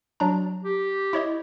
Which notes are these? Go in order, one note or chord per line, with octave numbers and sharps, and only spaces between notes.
F#3 D4 A#5
G4
E4 C#5 D#5